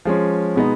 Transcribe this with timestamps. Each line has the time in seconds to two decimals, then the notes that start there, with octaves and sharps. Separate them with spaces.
0.05 F3 G#3 C#4
0.55 B2 G#3 B3 D#4